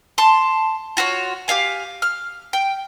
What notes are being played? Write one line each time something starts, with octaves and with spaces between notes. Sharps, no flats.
A5 C6
F4 F#4 A4 C#5
G4 C#5 F5 G#5
F6
G5